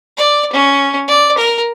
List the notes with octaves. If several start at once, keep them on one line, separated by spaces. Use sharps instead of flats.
D5
C#4
D5
A#4